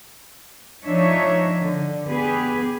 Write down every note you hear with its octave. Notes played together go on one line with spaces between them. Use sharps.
F3 D4 D#4 C#5 E5
D3
B3 G4 G#4 B4